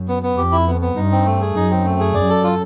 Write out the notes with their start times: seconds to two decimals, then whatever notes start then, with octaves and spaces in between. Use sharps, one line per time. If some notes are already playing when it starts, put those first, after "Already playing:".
Already playing: F#2
0.08 B3
0.23 B3
0.37 F2 G4
0.52 E4
0.67 B3
0.81 B3
0.96 G2 D#4
1.12 C4
1.26 A3
1.41 G#4
1.55 F#2 D#4
1.71 C4
1.85 A3
2.00 G#4
2.14 F#2 D5
2.29 A4
2.44 F4